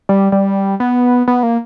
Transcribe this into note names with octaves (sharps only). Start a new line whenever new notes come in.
G3
G3
B3
B3
A#3